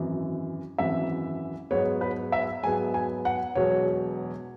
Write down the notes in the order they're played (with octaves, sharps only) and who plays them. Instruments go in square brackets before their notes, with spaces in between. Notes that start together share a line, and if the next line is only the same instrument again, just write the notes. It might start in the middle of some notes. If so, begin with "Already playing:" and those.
Already playing: [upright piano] G#1 F#2 E3
G#1 F#2 E3 E5
G#2 F#3 B3 C#5
B4
E5
G#2 F#3 B3 G#5
G#5
F#5
E1 E2 B2 F#3 B3 C#5